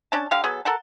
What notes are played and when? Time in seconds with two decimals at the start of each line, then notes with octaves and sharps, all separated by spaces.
0.12 C#4 D4 A5
0.31 D3 G4 F5
0.43 F#3 B3 G#4 A4
0.65 A4 A#4 F#5 A5